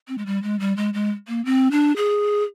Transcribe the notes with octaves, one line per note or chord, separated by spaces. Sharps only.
C4
G#3
G3
G#3
G3
G#3
G#3
A#3
C4
D4
G#4